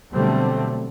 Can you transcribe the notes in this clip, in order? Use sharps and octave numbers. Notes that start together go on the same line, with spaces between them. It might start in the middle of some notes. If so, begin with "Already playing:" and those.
B2 D3 F#3 G3 A3 C4